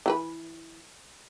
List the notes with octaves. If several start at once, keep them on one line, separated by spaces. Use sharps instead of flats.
E3 F#4 B4